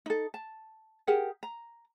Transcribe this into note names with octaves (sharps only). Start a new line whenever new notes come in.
D#4 A4
A5
G4 G#4 A#4 F#5
A#5